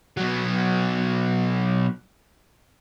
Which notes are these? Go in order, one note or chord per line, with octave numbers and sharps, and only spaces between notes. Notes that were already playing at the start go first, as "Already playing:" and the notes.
B2 F#3